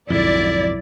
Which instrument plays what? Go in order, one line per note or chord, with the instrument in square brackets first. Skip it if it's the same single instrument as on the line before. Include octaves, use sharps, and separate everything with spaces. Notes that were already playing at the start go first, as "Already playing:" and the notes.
[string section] B1 D5 [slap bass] F2 G#2 D3 [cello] E4